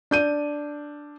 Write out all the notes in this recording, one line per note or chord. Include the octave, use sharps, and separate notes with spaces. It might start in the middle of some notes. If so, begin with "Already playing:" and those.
D4 G6 D#7